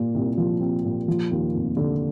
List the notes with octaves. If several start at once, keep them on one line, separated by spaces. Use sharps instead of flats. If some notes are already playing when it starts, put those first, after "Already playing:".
Already playing: A#2
C2
F3
C4
A#2
F3
D#2
F1
D3